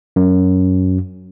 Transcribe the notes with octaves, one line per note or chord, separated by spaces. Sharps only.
F#2